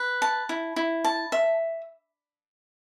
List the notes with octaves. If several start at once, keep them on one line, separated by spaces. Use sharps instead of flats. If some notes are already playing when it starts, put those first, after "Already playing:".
Already playing: B4
A5
E4
E4
A5
E5